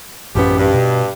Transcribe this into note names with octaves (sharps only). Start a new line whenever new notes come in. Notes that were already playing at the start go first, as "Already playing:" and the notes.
A1 F#2 F3 B3 C#4 G4
G2
B2